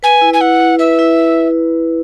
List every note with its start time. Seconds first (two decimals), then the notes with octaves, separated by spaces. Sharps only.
0.03 B4 G#5
0.21 E4
0.34 G#5
0.41 E4 F#5
0.60 E4
0.79 B4 E5
0.99 E4